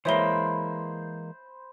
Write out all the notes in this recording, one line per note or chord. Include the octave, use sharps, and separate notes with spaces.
E3 G#3 A#3 C5 C#5 E5 B5 G7